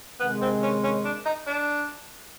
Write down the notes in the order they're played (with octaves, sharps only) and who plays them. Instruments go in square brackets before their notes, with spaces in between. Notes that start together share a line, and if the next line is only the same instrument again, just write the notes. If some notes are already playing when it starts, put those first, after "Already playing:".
[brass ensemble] C3 D#3 G#3 [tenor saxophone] B3
[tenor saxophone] C4
C#4
C#4
D4
D#4
D4